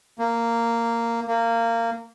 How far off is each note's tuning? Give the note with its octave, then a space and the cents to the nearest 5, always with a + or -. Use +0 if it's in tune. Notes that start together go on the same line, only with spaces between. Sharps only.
A#3 -10
A#3 -20